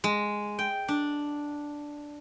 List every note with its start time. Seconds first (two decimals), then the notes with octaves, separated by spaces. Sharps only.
0.04 G#3
0.59 G5
0.88 D4